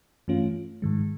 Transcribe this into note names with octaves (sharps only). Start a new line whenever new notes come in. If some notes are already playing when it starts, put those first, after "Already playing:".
G2 E3 A3 C#4 F4
G#2 D#3 G#3